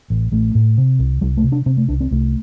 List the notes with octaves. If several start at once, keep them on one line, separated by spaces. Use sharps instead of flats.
A1
A1 A3
A2
C3
C2
C2 G3
A3
C3
D4
C3 C4
A3
C2 D4
C4
C2 A3